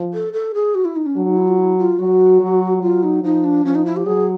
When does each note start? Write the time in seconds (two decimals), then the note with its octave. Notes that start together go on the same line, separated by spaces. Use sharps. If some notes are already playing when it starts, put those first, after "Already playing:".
Already playing: F3
0.14 A4
0.33 A4
0.54 G#4
0.75 F#4
0.85 E4
0.96 D#4
1.06 C#4
1.16 F#3 D4
1.27 D#4
1.37 E4
1.48 F4
1.58 E4
1.78 F4
1.99 F#3 F#4
2.41 F#3
2.82 F#3 F4
3.03 D#4
3.23 F3 D#4
3.44 D4
3.65 F3 C#4
3.75 D#4
3.86 E4
3.96 G4
4.06 F#3 G#4